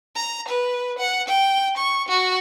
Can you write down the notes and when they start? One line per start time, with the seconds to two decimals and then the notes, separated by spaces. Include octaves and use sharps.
0.16 A#5
0.48 B4
0.98 F#5
1.28 G5
1.77 C#6
2.08 F#4